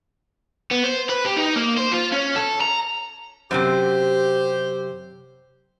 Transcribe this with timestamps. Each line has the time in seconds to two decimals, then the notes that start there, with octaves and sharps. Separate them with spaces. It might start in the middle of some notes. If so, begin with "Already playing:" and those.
0.71 B3
0.84 C5
1.09 B4
1.25 G4
1.36 D#4
1.56 A#3
1.77 C5
1.91 F4
2.12 C#4
2.36 A4
2.61 A#5
3.51 F#2 A2 C3 G4 C5